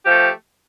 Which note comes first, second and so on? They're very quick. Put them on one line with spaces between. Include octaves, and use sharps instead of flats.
G4 F3 A3